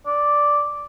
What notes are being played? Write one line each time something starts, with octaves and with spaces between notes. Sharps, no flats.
D5